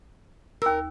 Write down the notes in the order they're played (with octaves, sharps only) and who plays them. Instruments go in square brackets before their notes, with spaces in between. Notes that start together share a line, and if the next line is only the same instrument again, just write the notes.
[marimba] D#2 E6 [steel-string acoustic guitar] A#4